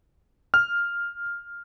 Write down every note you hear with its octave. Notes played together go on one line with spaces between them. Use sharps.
F6